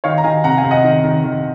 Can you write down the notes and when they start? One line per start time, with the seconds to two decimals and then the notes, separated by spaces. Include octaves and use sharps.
0.04 D#3 C#5 F5
0.18 A#5
0.24 D#3 F5 G#5
0.44 C3 F#5 A#5
0.57 F5 G#5
0.64 C3
0.71 D#5 F#5
0.84 D#3
1.04 D#3
1.24 D#3